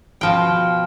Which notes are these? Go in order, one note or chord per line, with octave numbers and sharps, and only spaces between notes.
B2 F3 G5